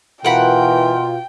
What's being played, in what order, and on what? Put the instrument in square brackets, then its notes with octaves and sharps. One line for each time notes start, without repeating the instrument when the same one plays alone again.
[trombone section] B2 F4 [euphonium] E3 [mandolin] A#4 F#5 B5 [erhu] G5